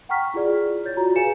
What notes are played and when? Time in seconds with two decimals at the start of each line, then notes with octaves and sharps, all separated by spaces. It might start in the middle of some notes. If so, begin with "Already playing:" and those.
0.09 F#5 G5 A#5 C#6 F6 B6
0.34 E4 F4 G#4 D5
0.85 C#5 G6 A6
0.97 F4 F#4 A#5
1.16 G#4 B4 F5 G#5 C#7 E7